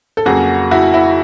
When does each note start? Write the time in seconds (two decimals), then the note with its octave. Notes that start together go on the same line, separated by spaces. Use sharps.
0.17 A4
0.26 F2 C#3 F#3 A#3 F#4 G#4
0.71 E4 F#4
0.94 E4